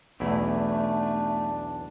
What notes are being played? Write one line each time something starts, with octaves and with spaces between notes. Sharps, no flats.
B1 E2 A3 D4 E4